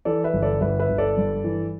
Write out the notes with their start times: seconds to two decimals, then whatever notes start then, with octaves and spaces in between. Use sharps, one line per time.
0.05 E3 A4 D5
0.24 B4 E5
0.33 G1
0.42 A4 D5
0.61 G1 B4 E5
0.79 B4 E5
0.89 G1
0.98 A4 D5
1.17 G2
1.44 E3